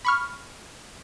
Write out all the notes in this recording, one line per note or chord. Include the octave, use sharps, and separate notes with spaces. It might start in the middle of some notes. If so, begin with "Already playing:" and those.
B5 C#6 F6